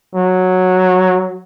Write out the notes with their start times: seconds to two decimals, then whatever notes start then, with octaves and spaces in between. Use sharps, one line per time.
0.15 F#3